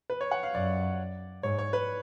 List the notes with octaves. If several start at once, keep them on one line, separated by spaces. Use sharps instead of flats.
B4
C#5
F#5
F5
F#2 D5
G#2 C#5
C#5
B4